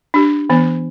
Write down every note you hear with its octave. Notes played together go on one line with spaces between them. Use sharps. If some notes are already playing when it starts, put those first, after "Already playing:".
D4 G4
E3 B3